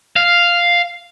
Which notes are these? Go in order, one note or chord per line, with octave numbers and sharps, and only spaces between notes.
F5